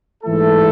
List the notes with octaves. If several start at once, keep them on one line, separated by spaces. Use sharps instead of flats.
G#2 E3 A3 E4 A4